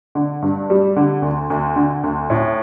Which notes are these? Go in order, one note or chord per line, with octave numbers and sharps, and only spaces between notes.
D3
G2
G3
D3
D2
D2
D3
D2
A2